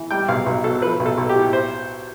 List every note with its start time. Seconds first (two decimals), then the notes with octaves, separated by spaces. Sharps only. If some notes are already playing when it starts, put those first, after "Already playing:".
Already playing: E3
0.11 G3 G5
0.28 B1 F5
0.46 B1
0.64 B2 A4
0.82 F3 B4
1.00 B1
1.06 A4
1.17 B1
1.29 G4
1.35 A2
1.53 C5